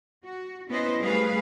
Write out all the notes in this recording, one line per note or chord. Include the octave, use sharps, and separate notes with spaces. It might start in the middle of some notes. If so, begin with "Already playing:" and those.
F#4
B3 C#4 E4 B4 C5 D#5
G3 A3 G#4 B4 F5